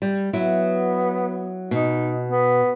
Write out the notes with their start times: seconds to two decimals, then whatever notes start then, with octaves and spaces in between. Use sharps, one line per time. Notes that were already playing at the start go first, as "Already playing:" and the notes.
0.02 G3
0.33 F#3 B3 E4
1.71 B2 D#4
2.28 B3